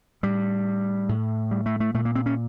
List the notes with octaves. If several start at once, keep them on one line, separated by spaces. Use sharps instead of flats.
A2 G3
A2
G3
A3
A3
A#2 A3
A#3
C4
C#4